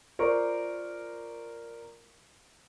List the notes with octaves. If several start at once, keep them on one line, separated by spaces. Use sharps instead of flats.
F4 A#4 C5 D5 C#6